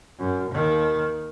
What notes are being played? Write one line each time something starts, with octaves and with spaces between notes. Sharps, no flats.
F#2
D#2 D#3